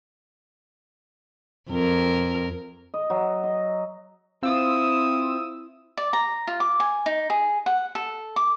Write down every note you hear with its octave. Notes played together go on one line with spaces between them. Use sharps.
F2 A#4
D#5
F#3
D#5
C4 E4 F4 D#6 E6
D5
A#5
F4
D6
G#5
D#4
G#4
F#5
A4
D6